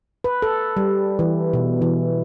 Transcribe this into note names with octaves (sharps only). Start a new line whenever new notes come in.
B4
A4
G3
E3
B2
E3